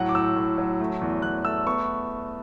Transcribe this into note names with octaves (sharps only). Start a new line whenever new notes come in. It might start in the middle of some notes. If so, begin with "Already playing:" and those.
Already playing: A2 F#3 F#5
D6
A2 E6
A2
F#3
A3
E2
E2 F#6
A3 E6
B3 C#6